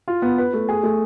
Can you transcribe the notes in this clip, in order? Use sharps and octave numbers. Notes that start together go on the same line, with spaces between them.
F4
B3
B4
A3
G#4
A3